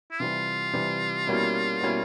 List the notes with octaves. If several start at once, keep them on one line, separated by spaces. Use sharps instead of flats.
E4
C3 E3 G3 F4
C3 E3 G3
B2 G3 A#3 C#4 E4
B2 G3 A#3 C#4 E4